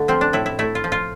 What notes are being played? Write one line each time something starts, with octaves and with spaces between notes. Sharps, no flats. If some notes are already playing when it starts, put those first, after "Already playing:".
Already playing: D3 A3
F3 C4
D4
A2 E4
E4
A3 E4
F4
F3
F4